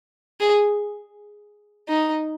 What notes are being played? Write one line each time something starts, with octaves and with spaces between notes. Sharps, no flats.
G#4
D#4